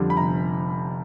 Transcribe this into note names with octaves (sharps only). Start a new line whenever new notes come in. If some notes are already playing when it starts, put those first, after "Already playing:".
Already playing: F2 D3 G3
B5
F1 A#5